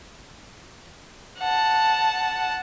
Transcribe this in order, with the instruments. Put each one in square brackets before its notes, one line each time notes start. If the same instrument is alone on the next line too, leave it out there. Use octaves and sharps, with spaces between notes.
[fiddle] F#5 A5